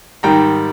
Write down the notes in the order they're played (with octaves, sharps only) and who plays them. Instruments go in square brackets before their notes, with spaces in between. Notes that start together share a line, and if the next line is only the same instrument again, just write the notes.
[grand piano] G#2 D#3 G3 G5 A#5